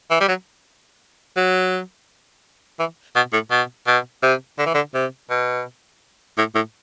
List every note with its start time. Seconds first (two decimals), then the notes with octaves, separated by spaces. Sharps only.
0.10 E3
0.21 G3
0.28 F#3
1.36 F#3
2.79 E3
3.16 B2
3.33 A2
3.51 B2
3.87 B2
4.23 C3
4.59 D3
4.66 E3
4.74 D3
4.94 C3
5.30 B2
6.38 A2
6.55 A2